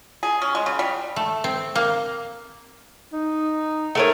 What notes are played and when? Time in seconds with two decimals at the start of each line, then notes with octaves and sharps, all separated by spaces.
0.23 G#4
0.42 C#4
0.55 G#3
0.66 C#3
0.79 G3
1.16 A3
1.44 C4
1.75 A#3
3.13 D#4
3.95 A3 A#4 C#5